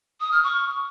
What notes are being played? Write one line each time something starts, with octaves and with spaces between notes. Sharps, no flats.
D#6
F6
C#6